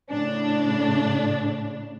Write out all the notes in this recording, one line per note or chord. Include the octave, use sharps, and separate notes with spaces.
A2 C#3 D4